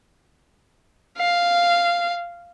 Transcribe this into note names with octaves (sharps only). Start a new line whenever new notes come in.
F5